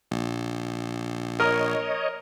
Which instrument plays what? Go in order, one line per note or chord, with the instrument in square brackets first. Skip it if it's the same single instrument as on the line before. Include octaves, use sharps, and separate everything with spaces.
[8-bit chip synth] A#1
[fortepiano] A#4 [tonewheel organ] C#5 D#5